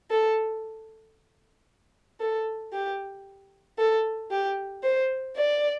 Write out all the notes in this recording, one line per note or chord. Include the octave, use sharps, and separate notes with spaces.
A4
A4
G4
A4
G4
C5
D5